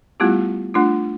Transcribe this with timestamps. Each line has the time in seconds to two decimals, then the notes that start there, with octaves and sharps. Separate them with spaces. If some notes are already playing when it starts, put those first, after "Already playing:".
0.20 G3 A3 B3 E4 F4 G4
0.74 A3 D4 F4